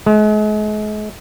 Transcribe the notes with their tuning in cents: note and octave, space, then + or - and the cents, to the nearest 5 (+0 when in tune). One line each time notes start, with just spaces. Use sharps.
G#3 +40